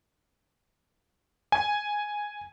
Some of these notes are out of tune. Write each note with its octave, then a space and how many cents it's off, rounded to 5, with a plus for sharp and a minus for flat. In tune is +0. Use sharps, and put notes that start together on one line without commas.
G#5 -5